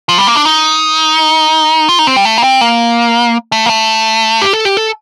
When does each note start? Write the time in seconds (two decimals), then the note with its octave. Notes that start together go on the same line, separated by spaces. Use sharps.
0.09 F3
0.18 G3
0.27 A#3
0.36 D4
0.45 D#4
1.89 F4
1.99 D#4
2.07 C4
2.16 G3
2.25 A3
2.38 A#3
2.44 C4
2.61 A#3
3.52 A3
3.66 A#3
3.69 A3
4.42 G4
4.53 A4
4.65 G4
4.77 A4